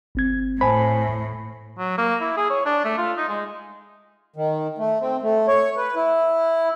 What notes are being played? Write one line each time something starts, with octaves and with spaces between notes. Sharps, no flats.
G1 C4 G#6
A2 C5 G#5 A5 B5
F#3
A#3
E4
G#4
C#5
D4
A3
F4
D#4
G#3
D#3
A3
C4
A3
C#5
B4
E4